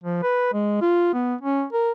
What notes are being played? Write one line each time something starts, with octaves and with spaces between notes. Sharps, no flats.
F3
B4
G#3
F4
B3
C#4
A#4